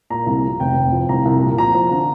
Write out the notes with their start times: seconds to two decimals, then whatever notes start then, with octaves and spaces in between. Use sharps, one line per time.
0.10 A#2 A#5
0.26 C2
0.43 F3
0.60 F1 G5
0.76 F1
0.92 F3
1.09 C2 A#5
1.25 C2
1.42 A#2
1.58 F3 A#5
1.74 F3
1.91 D3